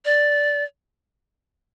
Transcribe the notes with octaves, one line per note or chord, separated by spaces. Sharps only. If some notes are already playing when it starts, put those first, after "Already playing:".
D5